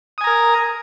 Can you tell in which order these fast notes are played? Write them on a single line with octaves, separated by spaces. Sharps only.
D#6 G#5 A#5 A#4